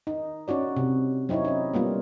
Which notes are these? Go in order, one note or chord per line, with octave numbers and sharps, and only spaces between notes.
D#4
C#4 D#4 F#4 D5
C3
F#3 C4 D#4 E4 C#5
C#4 D#4
G3 A#3 B3 F4